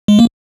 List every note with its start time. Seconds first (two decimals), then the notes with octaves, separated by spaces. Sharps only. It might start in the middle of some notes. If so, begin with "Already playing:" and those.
0.08 G#3
0.19 A#3